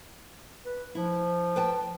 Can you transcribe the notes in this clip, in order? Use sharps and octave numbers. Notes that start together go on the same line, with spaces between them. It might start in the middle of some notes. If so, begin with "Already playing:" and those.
B4
F3 E4
B4 G5 A5